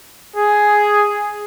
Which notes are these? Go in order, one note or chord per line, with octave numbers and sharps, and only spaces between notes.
G#4